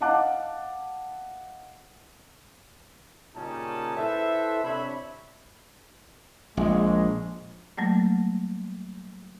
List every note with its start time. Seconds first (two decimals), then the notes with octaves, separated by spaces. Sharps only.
0.01 D#5 F5 F#5 A5 D6 F#6
3.34 A#2 C#3 G3 C#4 D#4 A5
3.97 E4 A4 B4 C5 E5
4.64 C3 D4 C5 C#5 E5 B5
6.57 A#1 G#3
7.77 F#3 G3 A3 A#3